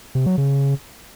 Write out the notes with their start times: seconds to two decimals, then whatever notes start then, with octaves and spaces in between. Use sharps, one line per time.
0.15 C3
0.26 F#3
0.38 C#3